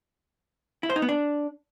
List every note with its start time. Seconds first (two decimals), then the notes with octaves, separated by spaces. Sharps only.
0.83 E4
0.90 C5
0.96 D#4
1.02 B3
1.09 D4